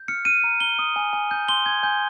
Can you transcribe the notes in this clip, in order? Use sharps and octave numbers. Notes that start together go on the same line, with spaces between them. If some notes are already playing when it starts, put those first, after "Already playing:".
Already playing: G6
F6 C#7
F6 D#7
A#5
A#5 G7
D#6
G#5
G#5
G6
C6 G7
G#5 G#6
G#5 G6